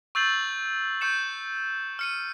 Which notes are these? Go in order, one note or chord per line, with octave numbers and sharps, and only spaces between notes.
C#6 E6 G6 A6 C7 F#7
C#6 G6 C#7 E7
F6 C#7 D#7